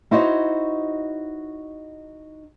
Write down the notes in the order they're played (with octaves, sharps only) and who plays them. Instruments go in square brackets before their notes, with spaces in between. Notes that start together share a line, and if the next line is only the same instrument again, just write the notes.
[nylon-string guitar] D#4 E4 F#4 C5 C#5 D#5